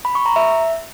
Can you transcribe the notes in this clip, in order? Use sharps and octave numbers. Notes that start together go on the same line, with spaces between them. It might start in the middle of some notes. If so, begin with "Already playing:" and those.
B5
C#6
A#5
E5